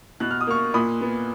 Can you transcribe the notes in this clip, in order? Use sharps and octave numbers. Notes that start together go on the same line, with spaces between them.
B2 F#6
F6
D#6
A#3 C#6 F6
A#2 B5 D#6
B3